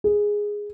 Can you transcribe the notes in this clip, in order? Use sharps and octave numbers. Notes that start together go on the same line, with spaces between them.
G#4